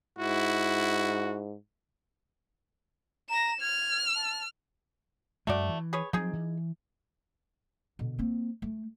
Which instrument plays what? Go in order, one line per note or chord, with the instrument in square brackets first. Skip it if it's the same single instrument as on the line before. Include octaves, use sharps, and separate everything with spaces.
[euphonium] G#2 [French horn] E4 [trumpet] F#4
[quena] A#5 [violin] A#6 E7
[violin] F6 [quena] G#6
[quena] A5
[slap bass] F#2 G#3 [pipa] A3 F#4 D5
[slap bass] E3
[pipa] G#4 B4 C#5
[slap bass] F3 F#3 C4 [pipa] D#4 G#4
[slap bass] E3
[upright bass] B2 D3
A#3 C4
A3